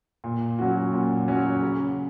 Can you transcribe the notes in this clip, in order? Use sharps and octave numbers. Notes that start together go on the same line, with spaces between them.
A#2
F#3 C#4 F#4
A#2
F#3 C#4 F#4
C#3